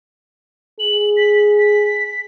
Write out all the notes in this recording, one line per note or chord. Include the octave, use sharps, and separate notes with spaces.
G#4 F#7
B6
B6